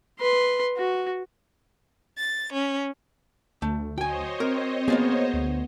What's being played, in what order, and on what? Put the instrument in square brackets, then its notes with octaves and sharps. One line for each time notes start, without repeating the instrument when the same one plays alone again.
[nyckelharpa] B4 C6
F#4
[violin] A6
C#4
[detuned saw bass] D2 [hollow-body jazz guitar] A3
[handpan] F#4 [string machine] C5 C#5 D#5 [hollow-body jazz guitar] G5 G#5
[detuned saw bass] C4 [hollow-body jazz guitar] A#4
[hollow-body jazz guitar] A#3 F4 G#4 [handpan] B3
[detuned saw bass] D2